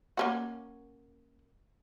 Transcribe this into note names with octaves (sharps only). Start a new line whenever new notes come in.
A#3 C#4 F#4